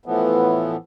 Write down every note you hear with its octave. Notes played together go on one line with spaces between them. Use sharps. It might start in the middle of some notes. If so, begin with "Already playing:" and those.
A2 E3 F3 B3